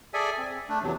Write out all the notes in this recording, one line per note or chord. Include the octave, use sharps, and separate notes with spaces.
G#4 A4 D5 E5 G#5
C4
A3 D4
E2 C3 F#3